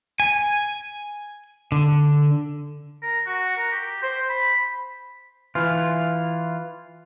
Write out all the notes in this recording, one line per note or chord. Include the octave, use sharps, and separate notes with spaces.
G#5
D3
A#4
F#4
A#4
G4
C5
B5
E3 F4